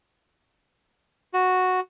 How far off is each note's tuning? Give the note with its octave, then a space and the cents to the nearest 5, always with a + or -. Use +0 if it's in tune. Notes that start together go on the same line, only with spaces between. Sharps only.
F#4 -5